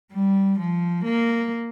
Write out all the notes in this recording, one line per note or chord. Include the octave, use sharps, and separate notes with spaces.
G3
F3
A#3